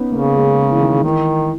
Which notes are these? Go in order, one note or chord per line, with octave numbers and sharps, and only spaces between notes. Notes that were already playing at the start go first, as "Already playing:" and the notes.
Already playing: B3 C#4 D#4
C#3 A#3
G#3
E3
D#3
D#3 E3